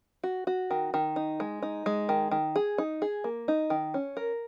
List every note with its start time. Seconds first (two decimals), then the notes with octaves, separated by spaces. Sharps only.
0.24 F#4
0.47 F#4
0.71 D#3
0.94 D#3
1.16 D#4
1.40 G#3
1.63 D#4
1.86 G#3
2.09 D#3
2.31 D#3
2.56 G#4
2.78 D#4
3.02 G#4
3.24 A#3
3.48 D#4
3.70 D#3
3.94 C#4
4.17 A#4